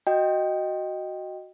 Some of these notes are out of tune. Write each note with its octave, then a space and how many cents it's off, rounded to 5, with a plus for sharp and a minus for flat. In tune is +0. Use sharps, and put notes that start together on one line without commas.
F#4 +0 D#5 +0 G5 +0